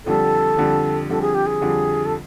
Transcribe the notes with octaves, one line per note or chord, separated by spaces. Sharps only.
F2 D3 G3 A4
F2 D3 G3
F2 D3 G3 A4
G#4
G4
G#4
F2 D3 G3
A4